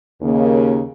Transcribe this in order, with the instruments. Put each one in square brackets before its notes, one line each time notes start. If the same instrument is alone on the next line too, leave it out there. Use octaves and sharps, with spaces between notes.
[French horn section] D#2 C#3 A#3